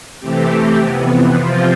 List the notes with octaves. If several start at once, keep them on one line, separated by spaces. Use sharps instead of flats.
C3 E3 A3 C4 G4
F2 C3 E3 B3
C3 F3 C4 F4